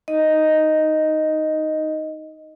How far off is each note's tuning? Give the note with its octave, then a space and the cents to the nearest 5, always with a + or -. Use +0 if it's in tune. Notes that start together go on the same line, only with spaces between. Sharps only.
D#4 +0 D#5 +0